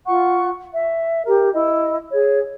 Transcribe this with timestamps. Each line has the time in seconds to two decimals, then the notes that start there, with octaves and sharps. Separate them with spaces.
0.05 F4 F#5 C#6 F#6
0.73 E5
1.26 G4 A#4
1.53 E4 D#5
2.10 G#4 C#5